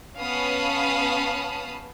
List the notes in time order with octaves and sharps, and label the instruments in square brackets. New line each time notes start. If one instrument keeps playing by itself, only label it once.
[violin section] B3 C#4 F5 A5 B5 D#6